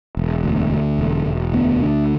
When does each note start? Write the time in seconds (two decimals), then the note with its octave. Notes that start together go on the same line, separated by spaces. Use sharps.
0.17 E1
0.44 D2
0.71 D3
0.99 E1
1.26 E1
1.53 D2 B3
1.82 D3